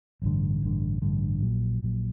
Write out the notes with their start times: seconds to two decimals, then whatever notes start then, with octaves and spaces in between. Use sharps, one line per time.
0.22 A1 G2 D3
0.62 A1 G2 D3
1.02 A1 G2 D3
1.42 A#1 A#2 F#3
1.82 A#1 A#2 F#3